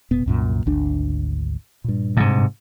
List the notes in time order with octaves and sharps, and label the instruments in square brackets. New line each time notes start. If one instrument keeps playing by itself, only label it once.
[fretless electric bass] E1 A#2 B3
C2 F#2 A#2
G#1 D2 D4
G2 A#2
[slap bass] G#2 C3